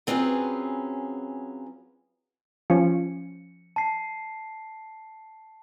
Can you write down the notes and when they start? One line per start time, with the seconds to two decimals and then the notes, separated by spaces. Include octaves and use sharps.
0.07 F#3 C4 C#4 F4 G#4 B4
2.70 F3 C#4 C#7
3.76 A5 C7